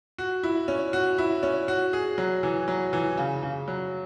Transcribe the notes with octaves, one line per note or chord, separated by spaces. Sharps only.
F#4
E4
C#4
F#4
E4
C#4
F#4
G#4
F#3
E3
F#3
E3
C#3
C#3
F#3